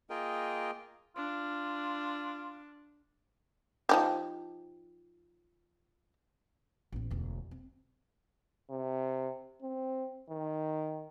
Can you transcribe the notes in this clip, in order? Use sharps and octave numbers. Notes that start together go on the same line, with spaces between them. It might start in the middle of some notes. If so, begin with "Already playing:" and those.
A#3 F4 G#4 A#4 D#5 G5
D4 F4
F3 D#4 G4
A1 B3
E1 D2
C4
C3
C4
D#3